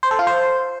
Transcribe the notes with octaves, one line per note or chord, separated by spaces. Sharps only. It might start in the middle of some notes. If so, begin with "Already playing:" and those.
C5
A4
F4
C5